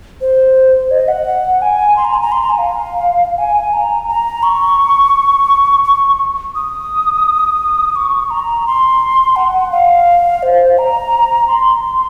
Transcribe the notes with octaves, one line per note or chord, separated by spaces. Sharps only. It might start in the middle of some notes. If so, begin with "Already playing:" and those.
C5
D#5
F#5
G#5
C6
A#5
G#5
A#5
C6
A#5
G#5
F5
G#5
A#5
A#5
C#6
C#6
D#6
C#6
A#5
C6
F#5
F5
C5
A#5
C6